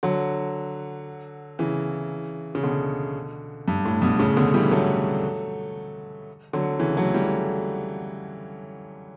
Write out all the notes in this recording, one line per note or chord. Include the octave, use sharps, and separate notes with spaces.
D3 F#3
C#3 E3
C#3
B2 D3
G2
A2
G2 B2
A2 C#3
B2 D3
E3 G3
F#3 A3
D3 F#3
C#3 E3
F#3 A3
E3 G3